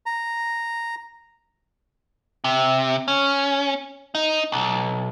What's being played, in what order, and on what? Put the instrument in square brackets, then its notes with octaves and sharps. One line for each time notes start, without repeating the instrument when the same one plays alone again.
[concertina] A#5
[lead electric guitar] C3
C#4
D#4
B1